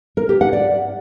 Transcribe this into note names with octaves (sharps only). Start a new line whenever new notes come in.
A#4
G4
F#5
D5